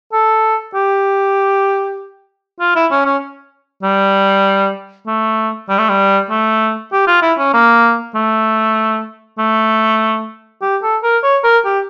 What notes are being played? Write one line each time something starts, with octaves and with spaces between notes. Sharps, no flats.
A4
G4
F4
E4
C#4
C#4
G3
A3
G3
A3
G3
A3
G4
F4
E4
C#4
A#3
A3
A3
G4
A4
A#4
C#5
A#4
G4